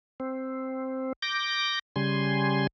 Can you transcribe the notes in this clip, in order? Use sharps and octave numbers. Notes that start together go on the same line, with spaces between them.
C4
D6 G6 A#6
C#3 G3 G#5 C6